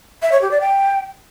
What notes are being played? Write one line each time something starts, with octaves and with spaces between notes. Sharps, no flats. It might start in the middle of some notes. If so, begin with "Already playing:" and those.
E5
C#5
G4
D5
G5